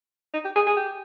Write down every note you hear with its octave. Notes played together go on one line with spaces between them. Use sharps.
D#4
G4
G#4
G#4
G4